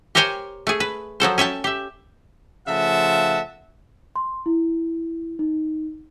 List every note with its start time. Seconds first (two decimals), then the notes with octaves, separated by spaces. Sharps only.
0.15 G4 A#4 C5 C#5 G5 G#5
0.67 A3 G#4
0.80 B4
1.20 F3 F#3 A4 C5
1.38 C#4 E5 G5 A5
1.64 G4 E5
2.68 C#3 F3 A3 E5 F#5 A5
4.16 C6
4.46 E4
5.39 D#4